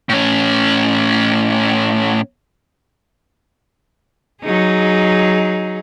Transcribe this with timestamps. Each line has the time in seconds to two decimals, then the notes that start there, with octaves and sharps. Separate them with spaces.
0.09 A2 C#4
4.43 F#3 D#4 G#4